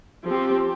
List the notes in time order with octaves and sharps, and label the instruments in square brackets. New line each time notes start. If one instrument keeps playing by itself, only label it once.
[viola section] F3 C4 G4